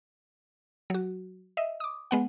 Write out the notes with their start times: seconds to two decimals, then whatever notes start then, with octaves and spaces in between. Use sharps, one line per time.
0.90 F#3 F#4
1.57 D#5 E5
1.80 D6 D#6
2.11 G#3 B3 F#5